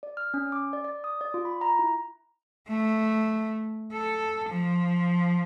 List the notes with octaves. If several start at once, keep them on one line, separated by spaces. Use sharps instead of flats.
D5
F6
C#4
D6
D5
D5
D#6
D5
F4
B5
A#5
E4
A3
A4
F3